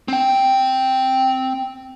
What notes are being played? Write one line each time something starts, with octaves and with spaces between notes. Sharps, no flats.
C4 G5